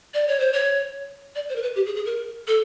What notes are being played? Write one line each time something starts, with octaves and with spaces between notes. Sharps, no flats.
D5
C#5
C5
C#5
D5
C5
A#4
B4
G4
G#4
G#4
A#4
A4